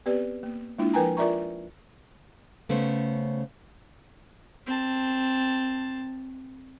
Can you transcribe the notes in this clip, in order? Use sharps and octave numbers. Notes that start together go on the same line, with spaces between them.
B3 C4 G4 B4 D5
A#3
G#3 A#3 D4 E4 F4
F3 A#4 B4 G5 G#5 A#5
F4 A#4 D5 E5 A#5 C#6
C#3 A3 B3 C#4 C5
C4 A5